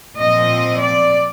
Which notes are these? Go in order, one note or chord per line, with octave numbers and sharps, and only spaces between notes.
A#2 F3 C4 D#5
D5